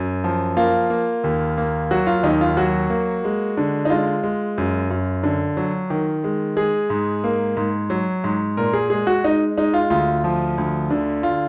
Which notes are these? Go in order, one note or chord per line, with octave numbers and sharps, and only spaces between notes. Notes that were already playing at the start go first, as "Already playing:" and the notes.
Already playing: F#2
F3
A#3 F4
A#3
D#2
A#3
F#3 F#4
F4
D#2 D#4
F4
F#3 F#4
A#3
G#3
D3
D#4
G#3 F4
G#3
F#2
F#2
D3
F#3
D#3
G#3
G#3 G#4
G#2
A#3
G#2
F#3
G#2
A#2 A#4
G#4
G#3 G#4
F#4
G#3 D#4
G#3 D#4
F4
D2 F4
F3
D2
D3
F4